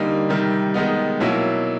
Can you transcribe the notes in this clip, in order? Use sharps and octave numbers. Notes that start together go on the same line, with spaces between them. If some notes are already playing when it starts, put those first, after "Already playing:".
Already playing: D3 G3 A#3 D#4
C3 D#3 G3
D#3 G#3 B3 D#4
B2 F#3 A#3 C#4 E4